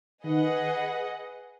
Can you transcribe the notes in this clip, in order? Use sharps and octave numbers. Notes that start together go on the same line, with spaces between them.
D#3 G#4 B4 D#5 F#5